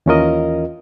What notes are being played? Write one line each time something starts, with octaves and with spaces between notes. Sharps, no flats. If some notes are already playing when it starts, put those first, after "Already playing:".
D#2 E3 C#4 F4 A#4 D#5